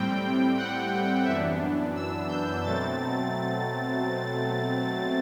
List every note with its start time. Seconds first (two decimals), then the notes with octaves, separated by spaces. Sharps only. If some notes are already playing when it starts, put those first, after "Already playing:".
Already playing: A2 G3 C4 G5
0.57 F#5
1.25 F#2 E3 B3 D4 E5
1.95 E6
2.28 G6
2.63 B2 F#3 A3 C4 A6